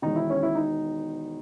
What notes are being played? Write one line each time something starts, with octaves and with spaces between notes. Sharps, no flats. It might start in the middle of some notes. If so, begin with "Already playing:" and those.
E1 E2 D#3 D#4
E4
C#4
E4
D#4